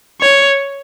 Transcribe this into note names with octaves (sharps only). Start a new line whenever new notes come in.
C#5